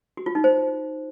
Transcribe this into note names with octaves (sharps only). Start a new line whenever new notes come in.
F#4
F4
D#4
C5